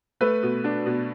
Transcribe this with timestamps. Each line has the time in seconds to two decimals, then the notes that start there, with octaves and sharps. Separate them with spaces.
0.21 A3 B4
0.43 B2
0.64 D4
0.86 B2